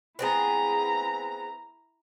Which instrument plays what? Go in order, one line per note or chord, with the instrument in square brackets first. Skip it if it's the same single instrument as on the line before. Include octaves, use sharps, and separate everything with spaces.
[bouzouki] B3 C4 G#4 [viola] E4 A#5